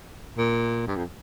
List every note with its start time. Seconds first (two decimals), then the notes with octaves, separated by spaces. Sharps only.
0.38 A#2
0.88 G2
0.96 F2